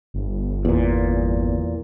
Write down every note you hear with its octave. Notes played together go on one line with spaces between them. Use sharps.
G1
E2 A#2